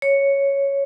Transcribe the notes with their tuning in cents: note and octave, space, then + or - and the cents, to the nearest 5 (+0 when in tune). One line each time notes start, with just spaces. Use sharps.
C#5 +0